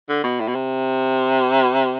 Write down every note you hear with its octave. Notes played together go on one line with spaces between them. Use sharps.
D3
B2
A2
B2
C3